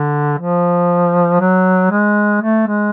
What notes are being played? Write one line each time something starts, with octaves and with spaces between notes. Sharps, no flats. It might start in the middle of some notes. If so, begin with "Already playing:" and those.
Already playing: D3
F3
F#3
G#3
A3
G#3